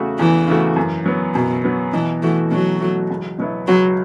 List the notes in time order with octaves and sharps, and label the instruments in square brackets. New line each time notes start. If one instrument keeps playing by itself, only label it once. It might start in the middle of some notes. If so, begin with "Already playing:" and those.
Already playing: [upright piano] E2 C#3 A3 F#4
[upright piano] E2 [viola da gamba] E3
[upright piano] C#3 A3 F#4
F#2
F#3 B3
[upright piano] F#2 [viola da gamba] B2
[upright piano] F#3 B3
[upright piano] B2 [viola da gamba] E3
[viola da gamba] E3 [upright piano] A3 F#4
[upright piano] B2 [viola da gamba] F#3
[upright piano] A3 F#4
C#2
B2 F#3 B3 E4
[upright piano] C#2 [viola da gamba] F#3